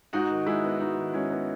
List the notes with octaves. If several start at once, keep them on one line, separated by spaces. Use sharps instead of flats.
G#2 D#4 F#4
D#3
G#3 E4 G#4
B3
G#2 D#4 F#4
D#3
G#3 C#4 E4
B3